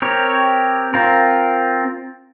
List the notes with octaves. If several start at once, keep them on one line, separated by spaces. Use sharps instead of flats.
C4 G4 A#4 C#5
C4 F4 A#4